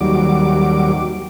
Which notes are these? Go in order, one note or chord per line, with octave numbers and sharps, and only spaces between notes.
D#2 F#3 G3 D6